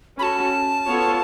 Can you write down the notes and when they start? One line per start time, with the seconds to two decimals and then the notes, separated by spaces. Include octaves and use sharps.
0.18 C#4 F#4 A4 A5 B5
0.88 B3 F4 A4 C#5